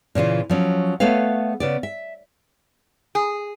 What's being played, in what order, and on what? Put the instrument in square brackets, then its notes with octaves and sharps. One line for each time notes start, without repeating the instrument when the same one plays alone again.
[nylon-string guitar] A#2 C#3 E3 F4
F3 F#3 C#4
A3 B3 A4 B4 C#5 F5
C#3 B3 D5
E5
[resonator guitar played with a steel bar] G#4